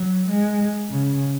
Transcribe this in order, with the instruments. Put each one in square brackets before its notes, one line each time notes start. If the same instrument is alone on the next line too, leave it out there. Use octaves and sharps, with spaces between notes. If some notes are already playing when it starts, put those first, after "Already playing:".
Already playing: [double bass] F#3
G#3
C#3